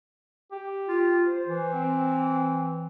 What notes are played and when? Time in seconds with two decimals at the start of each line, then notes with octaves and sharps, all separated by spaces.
0.52 G4
0.88 F4
1.26 C5
1.46 E3
1.73 C4